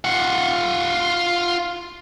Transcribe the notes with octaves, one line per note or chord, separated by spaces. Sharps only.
F4 F#5